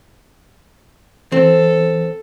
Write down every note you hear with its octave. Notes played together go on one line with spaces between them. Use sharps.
E3 C4 A4